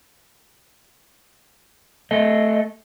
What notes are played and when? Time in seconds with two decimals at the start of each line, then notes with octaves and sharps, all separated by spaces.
2.11 A3 D#5